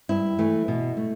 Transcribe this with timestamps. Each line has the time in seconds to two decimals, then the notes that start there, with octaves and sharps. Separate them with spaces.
0.09 G2 E4
0.38 E3 A3
0.68 B2
0.97 A3